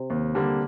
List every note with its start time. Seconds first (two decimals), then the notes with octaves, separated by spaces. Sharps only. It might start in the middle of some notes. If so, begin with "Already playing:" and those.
Already playing: C3
0.10 D#2
0.35 D3 G3 A#3